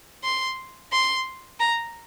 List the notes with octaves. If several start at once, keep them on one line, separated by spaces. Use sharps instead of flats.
C6
C6
A#5